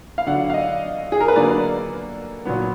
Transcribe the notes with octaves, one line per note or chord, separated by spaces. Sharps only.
F5
D3 F#3 D4 F#5
F5
D#5
G#4
A#4
B4
D3 F#3 A#3 D4 D5
A#2 F#3 B3